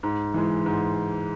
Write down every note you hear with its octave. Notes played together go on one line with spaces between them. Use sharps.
G#2
E3 G#3
G#2